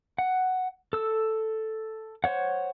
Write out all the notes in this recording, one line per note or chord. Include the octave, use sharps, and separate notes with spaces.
F#5
A4 E6
C5 C#5 F#5